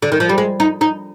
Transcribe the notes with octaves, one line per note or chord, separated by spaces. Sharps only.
D3
D#3
F3
G3
G#3
D#4
D#4